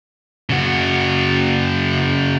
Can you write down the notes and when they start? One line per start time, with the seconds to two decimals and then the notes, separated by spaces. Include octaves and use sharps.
0.50 C#3 F#4